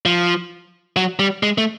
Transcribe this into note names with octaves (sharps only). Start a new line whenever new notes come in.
F3
F#3
G3
G#3
A3